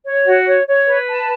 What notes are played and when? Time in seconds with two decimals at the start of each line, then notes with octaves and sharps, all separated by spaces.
0.05 C#5
0.26 F#4
0.46 C#5
0.67 C#5
0.87 B4
1.08 A5